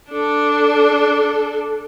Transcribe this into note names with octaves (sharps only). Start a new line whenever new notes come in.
D4 A4